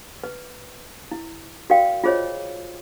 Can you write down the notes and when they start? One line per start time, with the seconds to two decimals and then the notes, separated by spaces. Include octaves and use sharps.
0.24 B4
1.11 E4
1.70 F#4 A#4 D5 F5 G5
2.04 F4 G#4 C5 C#5 D#5